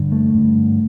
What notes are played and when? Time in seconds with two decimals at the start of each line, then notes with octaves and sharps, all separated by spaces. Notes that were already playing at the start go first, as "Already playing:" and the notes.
Already playing: G2 D3
0.12 A3
0.34 G2 D3